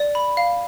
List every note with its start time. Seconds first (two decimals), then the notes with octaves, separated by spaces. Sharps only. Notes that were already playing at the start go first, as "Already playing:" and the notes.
Already playing: D5
0.15 B5
0.37 F5